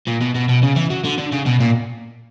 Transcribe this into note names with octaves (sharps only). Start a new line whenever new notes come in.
A#2
B2
B2
B2
C#3
E3
F#3
D3
D3
C#3
B2
A#2